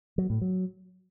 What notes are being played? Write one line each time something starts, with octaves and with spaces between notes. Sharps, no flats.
F#3
A2
F#3